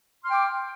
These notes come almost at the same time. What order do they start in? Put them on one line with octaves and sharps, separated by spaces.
C6 F6 G5 D6